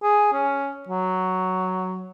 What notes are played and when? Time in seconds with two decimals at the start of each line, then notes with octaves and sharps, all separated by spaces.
0.03 G#4
0.33 C#4
0.89 F#3